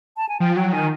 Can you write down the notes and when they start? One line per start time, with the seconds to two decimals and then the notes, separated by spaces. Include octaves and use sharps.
0.17 A5
0.29 G#5
0.40 F3 G5
0.56 F#3 G5
0.72 D#3 G#5